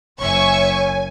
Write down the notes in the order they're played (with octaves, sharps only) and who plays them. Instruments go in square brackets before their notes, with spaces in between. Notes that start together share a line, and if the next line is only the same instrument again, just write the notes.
[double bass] F#1 [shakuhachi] C#5 [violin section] E5 C#6 [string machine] G#5